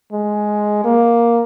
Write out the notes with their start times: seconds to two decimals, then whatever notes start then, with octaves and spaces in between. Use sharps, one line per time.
0.12 G#3
0.84 A#3